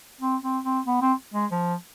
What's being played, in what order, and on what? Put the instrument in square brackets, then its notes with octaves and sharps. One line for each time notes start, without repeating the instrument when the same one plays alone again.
[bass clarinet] C4
C4
C4
B3
C4
G#3
F3